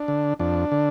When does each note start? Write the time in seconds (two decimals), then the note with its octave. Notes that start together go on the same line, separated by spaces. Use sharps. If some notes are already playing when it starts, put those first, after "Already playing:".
Already playing: D4
0.08 D3
0.40 F2 D4
0.72 D3